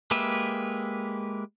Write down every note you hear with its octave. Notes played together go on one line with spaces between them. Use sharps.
G#3 A#3 G4 B4 E5